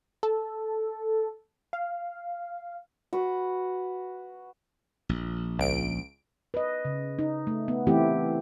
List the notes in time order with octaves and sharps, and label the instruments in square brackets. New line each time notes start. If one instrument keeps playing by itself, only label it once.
[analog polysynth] A4
F5
[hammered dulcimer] F#4 B4
[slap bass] A#1
[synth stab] C#2 D7
[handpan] B4 D#5
C#3
D#4
A3
B3
E3 A3 C4 E4 G4